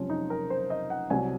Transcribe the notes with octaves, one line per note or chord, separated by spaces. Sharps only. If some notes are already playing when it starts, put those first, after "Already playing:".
Already playing: F#1 F2 C3 F3 G#3 C#4 F4
D#4
A#4
C5
D#5
F#5
C2 C3 F#3 G#5